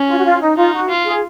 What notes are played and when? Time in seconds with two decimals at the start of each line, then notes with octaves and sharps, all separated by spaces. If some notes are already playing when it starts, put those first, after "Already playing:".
Already playing: C#4
0.08 F4
0.17 F#4
0.25 F4
0.40 D#4
0.57 D#4 F4
0.73 F#4
0.89 F4
1.05 G#4